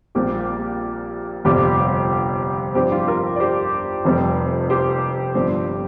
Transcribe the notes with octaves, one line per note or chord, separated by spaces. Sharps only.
A#1 A#2 G3 C4 G4
G1 F2 C3 G3 G4
G2 F3 C4 G4 C5
F4
G4
F4 A#4
D5
G4 C5
F1 F2 C3 G3 C4
G4 C5
G1 G2 F3 C4